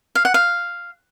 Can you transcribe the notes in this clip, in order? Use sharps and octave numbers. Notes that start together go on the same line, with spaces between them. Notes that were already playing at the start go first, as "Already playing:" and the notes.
F5
F#5
F5